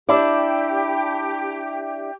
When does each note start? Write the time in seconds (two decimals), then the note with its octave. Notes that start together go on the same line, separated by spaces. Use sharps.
0.09 D4 E4 G4 D5